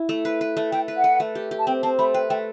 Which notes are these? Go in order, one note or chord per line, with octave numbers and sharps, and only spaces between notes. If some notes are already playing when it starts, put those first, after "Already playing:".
Already playing: E4
A3
B4
B4
A3
A3 G5
B4
F#5
B4
A3
G4
G4
A5
C4 G5
C4 A5
A3 B5
B4 G5
A3 G5